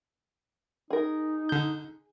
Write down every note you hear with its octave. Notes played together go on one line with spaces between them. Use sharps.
D#4 G#4 A#4
D3 G6